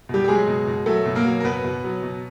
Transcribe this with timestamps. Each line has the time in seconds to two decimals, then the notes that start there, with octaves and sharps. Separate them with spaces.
0.09 B2 G3 G4
0.24 G4
0.28 F#3 G#3 G#4
0.47 B2
0.67 B2
0.86 F#3 A3 A4
1.06 B2
1.15 A#3 A#4
1.25 F#3
1.40 A#4
1.44 B2 B3 B4
1.65 B2
1.84 F#3
2.03 B2